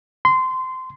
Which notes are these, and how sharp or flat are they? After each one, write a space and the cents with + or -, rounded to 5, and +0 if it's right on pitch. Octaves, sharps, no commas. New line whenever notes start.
C6 -20